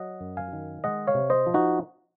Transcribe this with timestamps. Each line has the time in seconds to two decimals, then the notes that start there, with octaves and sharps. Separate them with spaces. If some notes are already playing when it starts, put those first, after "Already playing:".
Already playing: F#3 D#5 F#5
0.21 F#2
0.37 F5 G#5
0.53 D#3
0.84 G#3 D#5 F#5
1.07 C#5 F5
1.14 C3
1.30 C5 D#5
1.46 F3
1.54 D#4 F#4